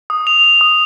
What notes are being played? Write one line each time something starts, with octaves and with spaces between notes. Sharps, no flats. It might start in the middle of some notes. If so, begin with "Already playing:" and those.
D#6
F7
F7
D#6